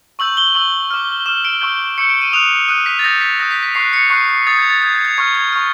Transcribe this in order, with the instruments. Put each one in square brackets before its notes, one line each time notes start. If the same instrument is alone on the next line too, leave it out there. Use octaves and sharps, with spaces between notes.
[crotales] C#6 E6 G6 F#7
G7
C#6 E6 G6 F#7
D6 F6
D6 F6 E7
D7
C#6 E6 G6
C#6 E6 G6 C#7
D7
D#7
D#6 F#6 F7
D#6 F#6 D#7
B6
A6
D#6 G6 A#6
B6
D#6 G6 A#6
B6
B6
C#6 F#6 C7
C#7
C#6 F#6 C7
C7
D#6 G6 A6
G#6
A6
D#6 G6 G#6
G#6
G#6
C#6 F6 G#6
G#6
C#6 F6